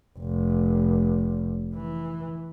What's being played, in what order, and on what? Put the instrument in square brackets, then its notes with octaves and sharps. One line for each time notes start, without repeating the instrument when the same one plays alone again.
[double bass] F1
E3